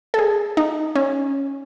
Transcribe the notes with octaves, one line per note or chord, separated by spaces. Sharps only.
A4
G#4
D#4
C#4